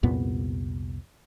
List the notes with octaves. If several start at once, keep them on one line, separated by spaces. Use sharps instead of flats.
C2 F2 A#2 B3